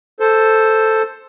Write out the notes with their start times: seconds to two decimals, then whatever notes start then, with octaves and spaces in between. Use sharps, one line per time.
0.20 A4 C5